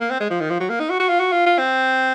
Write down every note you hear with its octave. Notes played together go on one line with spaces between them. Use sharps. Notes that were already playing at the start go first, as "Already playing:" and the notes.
A#3
C4
G#3
F3
D#3
F3
F#3
A#3
D#4
F#4
F#4
F4
F#4
F4
F4
C4